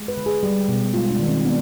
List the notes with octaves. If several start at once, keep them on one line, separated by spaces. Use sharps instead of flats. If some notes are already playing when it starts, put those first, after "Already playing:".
Already playing: G#3
B4
D3
G#4
G3 G4
B2
G#3 F4
D4
D#3
C4
B3 D4